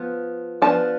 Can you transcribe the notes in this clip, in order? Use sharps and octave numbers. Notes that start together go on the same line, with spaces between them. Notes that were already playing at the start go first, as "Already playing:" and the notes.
Already playing: F3 B3
F3 B3 D4 A5